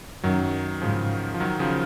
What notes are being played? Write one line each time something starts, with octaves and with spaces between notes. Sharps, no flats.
F#2 D#3 F#3
G#2 C#3 F3
F3
D#3 F#3
C#3 F3